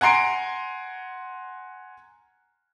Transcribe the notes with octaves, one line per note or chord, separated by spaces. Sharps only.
F#5 G#5 A#5 C6 C7 D7